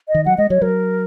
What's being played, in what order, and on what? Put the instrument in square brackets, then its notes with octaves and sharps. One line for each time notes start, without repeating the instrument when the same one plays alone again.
[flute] D#5
[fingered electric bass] D#3
[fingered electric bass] F#3 [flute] F#5
[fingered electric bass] G#3 [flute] D#5
[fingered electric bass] F#3 [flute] C#5
[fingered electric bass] F#3 [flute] A#4